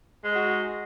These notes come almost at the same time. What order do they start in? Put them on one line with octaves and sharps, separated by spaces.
G#3 D#4 F#4